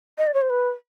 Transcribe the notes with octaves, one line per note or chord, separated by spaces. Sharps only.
D#5
D5
C#5
C5
B4